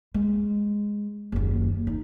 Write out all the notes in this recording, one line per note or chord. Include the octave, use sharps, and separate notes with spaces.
G#3
F#1 D#2
D#4